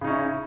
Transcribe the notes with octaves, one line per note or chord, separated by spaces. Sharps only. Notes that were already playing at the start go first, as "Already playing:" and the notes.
C#3 C#4 D#4 E4